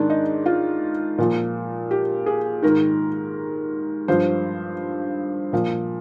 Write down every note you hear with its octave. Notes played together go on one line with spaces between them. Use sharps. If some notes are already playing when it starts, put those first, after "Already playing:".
Already playing: G#2 D#3 D4
D#4
F4
A#2 F3
G4
G#4
G#2 D#3 A#4
G2 F3 C5
A#2 F3